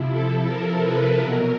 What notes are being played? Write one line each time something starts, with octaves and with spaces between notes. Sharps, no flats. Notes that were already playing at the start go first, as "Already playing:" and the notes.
Already playing: C3 F3 E4
A4
A#4
B4
B2 F#3 A#4